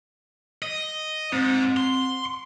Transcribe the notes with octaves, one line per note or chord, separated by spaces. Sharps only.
D#5
G#2 C4
C6